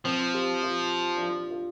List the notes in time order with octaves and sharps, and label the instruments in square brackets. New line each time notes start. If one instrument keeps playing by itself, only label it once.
[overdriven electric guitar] F3 [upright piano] C4
[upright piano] G4
F4
D4
F4
F4